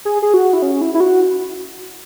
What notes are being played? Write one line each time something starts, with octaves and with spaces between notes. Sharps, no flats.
G#4
G#4
F#4
E4
C#4
E4
E4
F#4